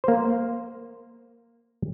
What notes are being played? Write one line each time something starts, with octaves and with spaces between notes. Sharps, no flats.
A#3 C5